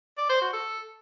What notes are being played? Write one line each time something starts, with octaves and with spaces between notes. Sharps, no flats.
D5
C5
F#4
A4